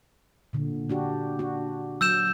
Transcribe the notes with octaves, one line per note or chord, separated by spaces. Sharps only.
A#2 D3
D4 F#4 G4
D4 F#4
F#3 E6 G6 E7